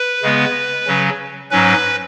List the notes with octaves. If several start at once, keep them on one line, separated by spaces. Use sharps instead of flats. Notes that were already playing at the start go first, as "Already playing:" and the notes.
Already playing: B4
C#3 G#3 B3
C#3 F#3 C#4
G#2 F#3 C#4 B4